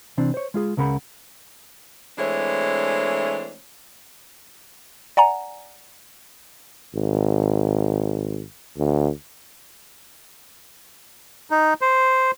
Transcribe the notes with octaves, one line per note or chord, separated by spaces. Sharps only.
C3 E3 C4 D4
C5 C#5
G#3 F4 G#4
C#2 C#3 A#4 F#5 B5
E3 G#3 A3 C4 D4 C#5
D5 F#5 G#5 A#5
G#1
D2
D#4
C5